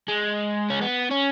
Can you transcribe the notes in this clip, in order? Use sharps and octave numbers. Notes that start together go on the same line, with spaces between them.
G#3
C#4
B3
C#4